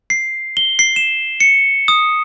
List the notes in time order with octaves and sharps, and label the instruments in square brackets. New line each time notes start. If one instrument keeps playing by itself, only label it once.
[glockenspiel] C7
G7
C7
E7
C#7
D#6